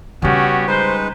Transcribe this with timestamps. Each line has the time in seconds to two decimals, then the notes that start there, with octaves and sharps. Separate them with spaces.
0.22 C#3 G3 B3 C#4 F#4 G4
0.67 G#3 D#4 B4 C5